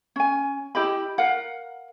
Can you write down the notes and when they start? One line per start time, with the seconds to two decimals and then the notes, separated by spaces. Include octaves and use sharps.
0.16 C#4 G#5
0.75 E4 G4 D#5 B5
1.18 A#4 F5 F#5